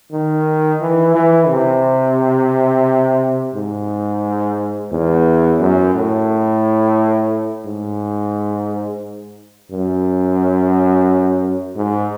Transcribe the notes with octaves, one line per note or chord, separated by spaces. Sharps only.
D#3
E3
E3
C3
G#2
E2
F#2
A2
G#2
F#2
G#2